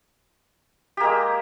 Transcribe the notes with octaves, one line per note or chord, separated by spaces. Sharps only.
G#3 A#3 G4